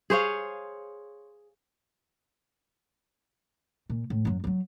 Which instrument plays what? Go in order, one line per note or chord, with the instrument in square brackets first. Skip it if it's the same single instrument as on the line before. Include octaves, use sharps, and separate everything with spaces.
[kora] G#4 C5 C#5 F5
[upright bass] A#2
A2
F#2 F#3
F#3 G3